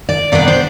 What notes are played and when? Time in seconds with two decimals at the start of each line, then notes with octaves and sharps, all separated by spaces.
0.09 D5
0.32 C3 G3 B3 D4 D5
0.48 C5